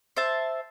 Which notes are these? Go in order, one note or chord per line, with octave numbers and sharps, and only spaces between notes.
C5 E5 A5